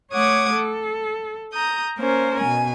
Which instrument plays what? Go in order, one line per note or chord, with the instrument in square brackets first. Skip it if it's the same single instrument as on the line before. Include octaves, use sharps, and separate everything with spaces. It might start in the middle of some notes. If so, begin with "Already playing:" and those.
[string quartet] A3 C#5 F#5 D6 D#6 G#6
A4
A#5 D#6 G6
A#3 C#4 A#4 C5
B2 G#5